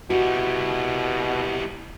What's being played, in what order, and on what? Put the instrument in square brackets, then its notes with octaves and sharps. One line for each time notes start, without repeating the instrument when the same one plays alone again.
[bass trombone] B2 [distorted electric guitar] G3 E4 [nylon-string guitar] F#4